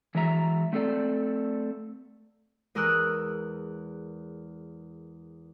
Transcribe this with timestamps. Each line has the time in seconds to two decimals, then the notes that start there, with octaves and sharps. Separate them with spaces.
0.15 E3 F#3 G#3 E5 A#5
0.73 A3 C4 A4 D5
2.75 E2 G#3 A#4 D#6 E6 F#6